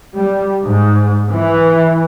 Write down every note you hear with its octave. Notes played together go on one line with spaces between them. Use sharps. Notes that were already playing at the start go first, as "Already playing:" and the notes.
G3
G#2
E3